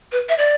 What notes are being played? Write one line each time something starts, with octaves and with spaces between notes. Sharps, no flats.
B4
E5
D5